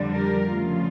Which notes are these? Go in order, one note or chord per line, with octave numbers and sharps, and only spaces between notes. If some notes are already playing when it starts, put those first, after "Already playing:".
Already playing: F2 D3 G3 D4
G4 A#4
D2 C#3 F3 A3 F4